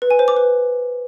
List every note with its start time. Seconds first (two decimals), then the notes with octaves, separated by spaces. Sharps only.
0.02 B4
0.11 G#5
0.19 C5
0.28 D6
0.37 B4